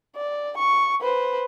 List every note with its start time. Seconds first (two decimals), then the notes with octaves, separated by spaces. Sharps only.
0.17 D5
0.58 C#6
1.01 B4 C5